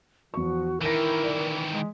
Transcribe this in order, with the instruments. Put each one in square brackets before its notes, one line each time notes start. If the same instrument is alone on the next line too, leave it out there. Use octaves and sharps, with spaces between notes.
[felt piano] E2 C#6 [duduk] F3 [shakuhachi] F#4
[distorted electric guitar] D#3 E3 [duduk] E4 [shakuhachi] A#4 [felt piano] A#6 D#7
[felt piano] D5
[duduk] G#3